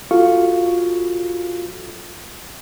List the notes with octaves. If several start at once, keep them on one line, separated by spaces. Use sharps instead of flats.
F4 F#4 A4 F5 C#6